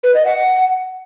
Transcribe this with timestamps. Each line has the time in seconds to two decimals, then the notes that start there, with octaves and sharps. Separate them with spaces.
0.04 B4
0.15 D#5
0.26 F#5